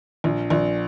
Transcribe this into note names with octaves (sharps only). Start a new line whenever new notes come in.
A#1
A#1